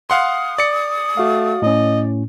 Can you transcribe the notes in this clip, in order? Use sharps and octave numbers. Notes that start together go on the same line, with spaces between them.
F5 F#5 C6 D#6
D5 C#7
A3 F#4 F5
A2 C#4 D#5